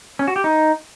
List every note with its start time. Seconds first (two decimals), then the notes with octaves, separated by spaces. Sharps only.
0.19 C#4
0.28 F#4
0.36 G4
0.44 D#4